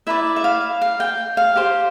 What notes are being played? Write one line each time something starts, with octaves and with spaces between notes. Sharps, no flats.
E4 B4 D5 E5
E5
F5
F5
G5
F5
G4 C5